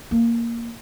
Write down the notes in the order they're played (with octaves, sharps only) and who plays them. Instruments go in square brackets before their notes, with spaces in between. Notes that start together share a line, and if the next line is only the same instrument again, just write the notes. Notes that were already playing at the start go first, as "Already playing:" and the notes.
[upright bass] A#3